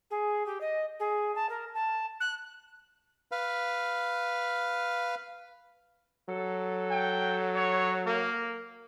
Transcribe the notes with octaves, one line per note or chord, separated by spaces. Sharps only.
G#4
G4
D#5
G#4
A5
A#4
A5
F#6
B4 F5
F#3 A4
G5
C#5
A#3